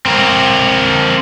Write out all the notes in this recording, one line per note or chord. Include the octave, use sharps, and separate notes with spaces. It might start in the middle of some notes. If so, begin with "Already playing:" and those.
C4 A#4